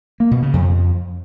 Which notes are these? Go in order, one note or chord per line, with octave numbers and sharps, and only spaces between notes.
A#3
B2
C#3
F2